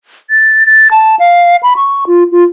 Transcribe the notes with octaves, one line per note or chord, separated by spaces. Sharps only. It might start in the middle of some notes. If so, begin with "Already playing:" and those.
A6
A6
A5
F5
B5
C#6
F4
F4